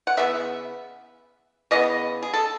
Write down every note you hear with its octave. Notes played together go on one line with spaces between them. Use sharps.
F#5
C#3 E3 B3 E5
C#3 E3 B3 D#5
G#4
A4